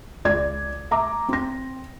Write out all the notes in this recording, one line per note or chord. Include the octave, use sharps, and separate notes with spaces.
C#2 D5 G#6
E5 A#5 D6
C4 A#6